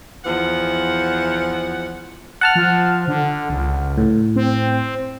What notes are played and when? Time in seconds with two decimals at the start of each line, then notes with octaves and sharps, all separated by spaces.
0.24 E2 F3 F#5
2.41 F#5 A5 F6
2.55 F3
3.08 D3
3.50 C#2
3.98 A2
4.36 C4